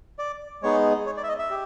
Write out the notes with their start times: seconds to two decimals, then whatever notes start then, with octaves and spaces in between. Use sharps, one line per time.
0.19 D5
0.62 G#3 B3 D#4 G#4 C#5
1.06 C#5
1.17 D5
1.24 E5
1.29 D#5
1.39 E5
1.50 G4